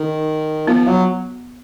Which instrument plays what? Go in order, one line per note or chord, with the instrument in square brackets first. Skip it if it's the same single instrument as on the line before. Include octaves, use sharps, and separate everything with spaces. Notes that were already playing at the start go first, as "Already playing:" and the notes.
Already playing: [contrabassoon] D#3
[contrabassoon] F3 [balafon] B3
[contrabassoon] F#3